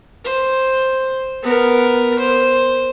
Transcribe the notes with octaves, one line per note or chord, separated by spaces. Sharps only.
C5
B3 A#4
C5